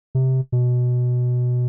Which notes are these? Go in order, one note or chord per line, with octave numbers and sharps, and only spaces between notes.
C3
B2